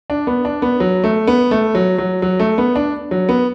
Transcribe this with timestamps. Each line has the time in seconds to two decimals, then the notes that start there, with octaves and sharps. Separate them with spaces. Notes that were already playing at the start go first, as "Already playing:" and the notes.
0.10 D4
0.27 B3
0.45 D4
0.62 B3
0.80 F#3
1.04 A3
1.27 B3
1.51 A3
1.75 F#3
1.98 F#3
2.22 F#3
2.40 A3
2.58 B3
2.76 D4
3.11 F#3
3.29 B3